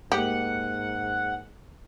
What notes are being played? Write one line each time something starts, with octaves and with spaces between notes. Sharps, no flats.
G#2 G#3 A#3 G4 F#5